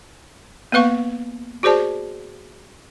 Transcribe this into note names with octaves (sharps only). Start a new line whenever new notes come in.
A#3 B3 B4 F5 C#6
F#4 G#4 C5 D5 A5